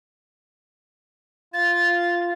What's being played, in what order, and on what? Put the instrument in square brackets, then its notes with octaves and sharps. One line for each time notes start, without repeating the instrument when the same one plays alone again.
[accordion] F4 [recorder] A6